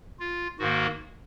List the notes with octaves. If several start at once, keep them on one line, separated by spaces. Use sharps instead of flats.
F4
G#2 D#3 A#3 F#4